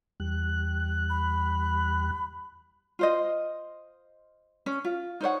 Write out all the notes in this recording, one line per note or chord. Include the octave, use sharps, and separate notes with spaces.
E2 G3 F#6
B5
F4 C5 D#5
C#4
F4
D#4 C5 C#5 F#5